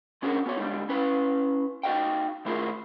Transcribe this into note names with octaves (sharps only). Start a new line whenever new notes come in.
D#3 C#4 D4 F#4 G#4 A#4
B3 F#4 C#5
D3 G3 G#3 D4 D#4
C#4 E4 B4
D#4 F#4 A#4 D#5 F5 G5
D#3 A3 E4 F4 G#4 A#4